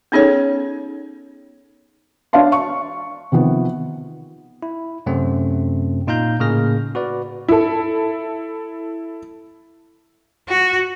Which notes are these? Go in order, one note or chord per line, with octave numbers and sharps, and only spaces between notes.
B3 C#4 D#4 G#4 A4 C#5
D4 C#5 E5 F5 A5 C6
C#6
C3 D#3 F3 B3
E4
F#2 C3 A3 C4
A#2 D#4 F5 A#5 G6
A2 C#3 A#3 G#4 F6 A#6
F#4 B4 D5
E4 A4
F#4